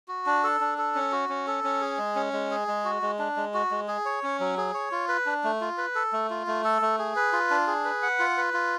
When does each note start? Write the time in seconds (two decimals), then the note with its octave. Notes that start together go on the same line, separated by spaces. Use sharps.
0.08 F#4
0.26 D4
0.44 A4
0.61 D4
0.78 A4
0.95 C#4
1.12 F#4
1.29 C#4
1.47 A4
1.64 C#4
1.81 G#4
1.98 G#3
2.16 C#4
2.33 G#3
2.51 G#4
2.68 G#3
2.85 F#4
3.02 G#3
3.19 D4
3.37 G#3
3.54 F#4
3.71 G#3
3.88 G#4
4.05 C#5
4.23 C#4
4.40 F#3
4.57 G#4
4.74 C#5
4.92 F4
5.09 B4
5.26 D4
5.44 A3
5.61 F4
5.78 B4
5.95 A4
6.13 A3
6.30 F4
6.47 A3
6.64 A4
6.82 A3
6.99 G#4
7.16 B4
7.33 F4
7.50 D4
7.67 G#4
7.85 B4
8.02 F#5
8.19 F4
8.37 B4
8.53 F4